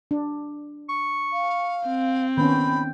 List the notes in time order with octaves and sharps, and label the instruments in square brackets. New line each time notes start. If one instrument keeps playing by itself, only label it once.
[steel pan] D4
[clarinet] C#6
[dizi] F5
[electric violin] C4
[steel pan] D#3 B3 C#4 [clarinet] G5 [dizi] B5